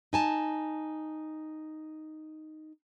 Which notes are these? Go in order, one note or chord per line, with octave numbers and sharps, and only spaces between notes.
D#4 G#5 A5